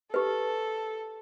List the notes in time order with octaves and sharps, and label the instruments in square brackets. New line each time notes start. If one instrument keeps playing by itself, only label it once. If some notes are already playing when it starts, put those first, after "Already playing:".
[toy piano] G4 B4 [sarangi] A4